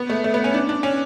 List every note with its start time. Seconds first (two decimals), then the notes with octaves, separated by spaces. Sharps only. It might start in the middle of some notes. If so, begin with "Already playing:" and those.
Already playing: B3
0.10 A3
0.24 A3
0.34 B3
0.44 C#4
0.54 D4
0.69 D4
0.83 C#4